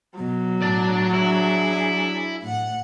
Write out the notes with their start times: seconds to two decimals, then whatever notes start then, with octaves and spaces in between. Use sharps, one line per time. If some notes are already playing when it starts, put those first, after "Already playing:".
0.19 B2 F#3
0.62 A2 D5 A5
1.13 D4 E4 G#4
2.42 A2 F#5